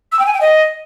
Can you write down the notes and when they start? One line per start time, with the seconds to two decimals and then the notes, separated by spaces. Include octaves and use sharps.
0.12 E6
0.19 G5
0.26 G#5
0.34 G5
0.41 D#5